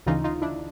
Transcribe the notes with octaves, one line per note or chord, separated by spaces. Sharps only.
D2 C#3 E3 D#4 F4
D#4 F4
D4 E4